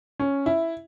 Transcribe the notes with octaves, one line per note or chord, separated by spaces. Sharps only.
C#4
E4